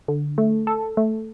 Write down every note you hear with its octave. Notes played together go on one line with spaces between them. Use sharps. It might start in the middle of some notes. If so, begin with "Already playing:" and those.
D3
A3
A4
A3